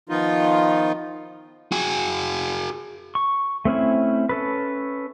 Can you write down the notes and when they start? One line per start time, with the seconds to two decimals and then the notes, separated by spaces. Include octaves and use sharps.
0.09 D#3 F3 B3 D#4 F4
1.72 F#4 G#4
3.15 C#6
3.65 A3 C4 C#4 E4
4.29 C#4 A4 B4